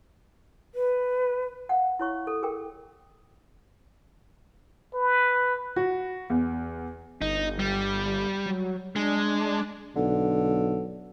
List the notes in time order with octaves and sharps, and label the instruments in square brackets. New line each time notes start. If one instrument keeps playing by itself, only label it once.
[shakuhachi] B4
[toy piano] F5 F#5
E4 C#5 C#6
A4
G#4 A#4 G5
[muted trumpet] B4
[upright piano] F#4
E2
[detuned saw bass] G1 [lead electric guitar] D#4
[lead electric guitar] G3
[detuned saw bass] F#3
[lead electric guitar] G#3 [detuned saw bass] D4
[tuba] B1 [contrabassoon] D3